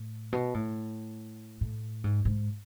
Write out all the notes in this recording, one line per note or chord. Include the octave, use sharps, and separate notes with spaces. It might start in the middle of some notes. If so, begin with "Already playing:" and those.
Already playing: A2
B2
A2
A2
G#2
G#2